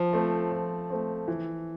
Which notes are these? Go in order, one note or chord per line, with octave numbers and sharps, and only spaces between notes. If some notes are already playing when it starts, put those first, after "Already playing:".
Already playing: F3
A3 C4
F3
A3 C4
E3